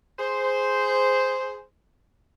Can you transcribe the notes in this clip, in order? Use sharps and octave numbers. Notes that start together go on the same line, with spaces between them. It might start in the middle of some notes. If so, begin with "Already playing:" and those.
G#4 C5